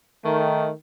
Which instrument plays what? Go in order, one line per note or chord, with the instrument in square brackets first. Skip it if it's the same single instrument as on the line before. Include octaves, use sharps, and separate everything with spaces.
[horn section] D#3 [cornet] A3